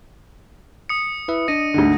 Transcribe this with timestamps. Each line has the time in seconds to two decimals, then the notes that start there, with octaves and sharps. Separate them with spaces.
0.89 D#6 C#7
1.28 E4 B4 E5
1.48 D4 D5 D#5 A#6 D#7
1.74 D2 G#2 D3